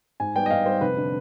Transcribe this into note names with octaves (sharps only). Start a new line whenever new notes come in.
G#2 G#5
G3 B3 G5
D#5
G#2 F5
G3 B3 C5
F1 B4
D3